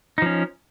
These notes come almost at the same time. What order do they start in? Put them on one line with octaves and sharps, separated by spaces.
D#4 F3 C#4